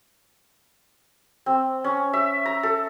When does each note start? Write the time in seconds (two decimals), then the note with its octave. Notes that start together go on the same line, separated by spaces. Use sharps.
1.46 C4
1.84 C#4
2.13 E5
2.46 A#5
2.63 A4